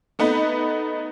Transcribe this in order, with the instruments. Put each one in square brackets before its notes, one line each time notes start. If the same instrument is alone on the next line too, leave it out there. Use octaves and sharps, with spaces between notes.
[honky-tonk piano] A3 B3 D#4 B4